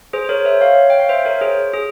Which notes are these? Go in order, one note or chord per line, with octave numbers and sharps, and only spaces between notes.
G#4 C5
C5
A#4 C#5
C5 E5
C#5 F5
G5
F5
C5 E5
A#4 C#5
G#4 C5
G#4